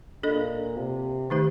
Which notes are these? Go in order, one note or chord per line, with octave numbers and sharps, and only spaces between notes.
A#2 D4 A4 D#5
C3
D#3 A3 D#4 G4 C5